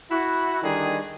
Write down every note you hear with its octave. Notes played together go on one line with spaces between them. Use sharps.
E4 F#4
D3 D#3 G3 D4 D#4 G#4